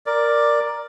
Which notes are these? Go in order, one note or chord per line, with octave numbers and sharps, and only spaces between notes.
A#4 D5